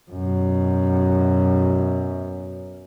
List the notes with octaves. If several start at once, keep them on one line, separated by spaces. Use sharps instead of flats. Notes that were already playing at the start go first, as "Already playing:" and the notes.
F#2 B2